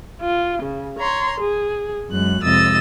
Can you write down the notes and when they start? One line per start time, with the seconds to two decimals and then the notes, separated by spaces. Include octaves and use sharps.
0.20 F4
0.62 C#3
0.98 C#5 A#5 C6
1.39 G#4
2.10 F#2 G#3 F#6
2.43 F2 C3 G#3 D#5 E6 A6